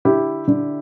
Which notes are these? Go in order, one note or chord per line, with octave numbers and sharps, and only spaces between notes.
D3 E4 G4
D3